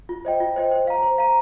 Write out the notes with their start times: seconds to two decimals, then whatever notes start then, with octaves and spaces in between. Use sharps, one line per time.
0.09 F4
0.25 C5 D#5 G5
0.40 F4
0.56 C5 D#5 G5
0.71 C5
0.87 F5 A#5
1.03 C5
1.18 F5 A#5